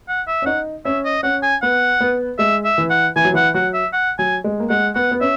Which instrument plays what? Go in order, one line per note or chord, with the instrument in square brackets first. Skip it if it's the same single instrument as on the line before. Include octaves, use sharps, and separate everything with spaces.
[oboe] F#5
E5
[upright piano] C#4
[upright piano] D#4 [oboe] F#5
[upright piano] C#4 [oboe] E5
[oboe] D#5
[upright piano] C#4 [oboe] F#5
[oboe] G#5
[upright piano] B3 [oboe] F#5
[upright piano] B3
[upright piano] G#3 [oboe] E5
[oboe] E5
[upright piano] E3
[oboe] F#5
[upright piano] E3 [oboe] G#5
[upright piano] F#3
[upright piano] E3 [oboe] F#5
[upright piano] F#3 [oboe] F#5
[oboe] E5
F#5
[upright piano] F#3 [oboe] G#5
[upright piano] G#3
A#3
[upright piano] G#3 [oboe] F#5
[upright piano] B3 [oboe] F#5
[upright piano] B3
[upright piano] C#4 [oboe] E5